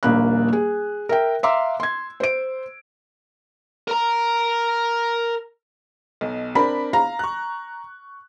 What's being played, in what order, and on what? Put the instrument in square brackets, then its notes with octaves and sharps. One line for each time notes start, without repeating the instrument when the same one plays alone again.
[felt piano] D#1 A#1 A#3 B5 F#6
G#4
A#4 E5 G5
E5 F5 A#5 C6 D6 E6
C6 G#6
C5 D7
[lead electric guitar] A#4 A#5
[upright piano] B1 B2
[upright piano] C4 D4 A#4 [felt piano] B5
[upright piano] F5 [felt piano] A#5
[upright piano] C#6 F#6